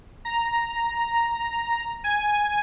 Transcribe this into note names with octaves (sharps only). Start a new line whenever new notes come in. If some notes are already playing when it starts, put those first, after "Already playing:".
A#5
G#5